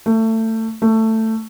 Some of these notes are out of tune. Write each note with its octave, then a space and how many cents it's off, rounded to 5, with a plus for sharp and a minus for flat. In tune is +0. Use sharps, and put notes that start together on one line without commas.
A3 +25
A3 +15